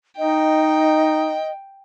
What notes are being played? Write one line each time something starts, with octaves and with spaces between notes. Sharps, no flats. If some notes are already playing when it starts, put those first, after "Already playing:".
D#4 D#5 G5